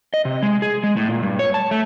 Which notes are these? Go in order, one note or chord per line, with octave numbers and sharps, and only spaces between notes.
D#5
C3
G#3
G#4
G#3
A2
A#2
G2
C#5
A5
A3